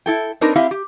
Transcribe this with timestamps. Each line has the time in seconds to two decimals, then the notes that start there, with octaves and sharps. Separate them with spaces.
0.06 E4 A4 G5
0.41 C4 D4 D#4 A#4 B4
0.56 C4 E4 G4 E5 F5
0.71 G4